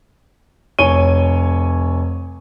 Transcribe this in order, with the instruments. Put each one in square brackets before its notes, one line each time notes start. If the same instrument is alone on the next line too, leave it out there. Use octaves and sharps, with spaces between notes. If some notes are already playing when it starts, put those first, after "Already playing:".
[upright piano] F1 C#5 G#5 D#7 G7